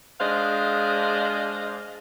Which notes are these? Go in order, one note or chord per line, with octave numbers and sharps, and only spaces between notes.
G#3 D4 C5 D#5 F5